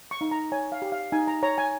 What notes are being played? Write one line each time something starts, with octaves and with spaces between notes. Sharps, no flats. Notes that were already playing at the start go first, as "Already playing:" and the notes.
C#6
D#4
A#5
C#5 G#5
F5
G4
F5
D#4 G#5
A#5
C#5 A#5
G#5